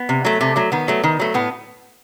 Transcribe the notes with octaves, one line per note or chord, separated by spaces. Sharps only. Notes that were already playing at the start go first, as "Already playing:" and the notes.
Already playing: B3
C3
F#3 A3
C3 A3
F#3 A3
D#3 B3
F#3 A3
D#3
F#3 A3
A2 B3